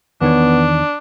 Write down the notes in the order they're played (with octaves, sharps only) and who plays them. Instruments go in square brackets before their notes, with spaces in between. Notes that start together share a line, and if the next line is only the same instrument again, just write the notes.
[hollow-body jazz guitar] E2 D#3 C#5 [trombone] B3 [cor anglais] D4